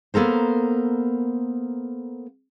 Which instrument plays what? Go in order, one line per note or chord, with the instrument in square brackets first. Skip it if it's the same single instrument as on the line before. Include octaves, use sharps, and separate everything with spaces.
[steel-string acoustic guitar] A#3 B3 A4 A#4 C5